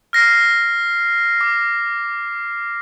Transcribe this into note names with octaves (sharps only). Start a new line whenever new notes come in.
F6 A#6 C7
D6